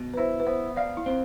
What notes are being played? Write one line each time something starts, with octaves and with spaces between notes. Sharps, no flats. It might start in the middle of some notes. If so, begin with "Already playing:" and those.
Already playing: B2
B4
E4 C5
B4
B3 C5
D5 F5
E4
C4